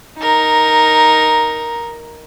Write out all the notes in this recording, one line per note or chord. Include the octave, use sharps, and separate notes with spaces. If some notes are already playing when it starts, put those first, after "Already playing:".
D#4 A#4